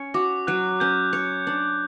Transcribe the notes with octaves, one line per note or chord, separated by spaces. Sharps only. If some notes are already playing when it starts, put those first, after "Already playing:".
Already playing: C#4 C#5
F#4 D6
F#3 F#6
C#4 G6
C#5
D4